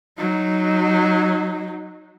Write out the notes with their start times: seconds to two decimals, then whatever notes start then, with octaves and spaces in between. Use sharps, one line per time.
0.18 F#3 D#4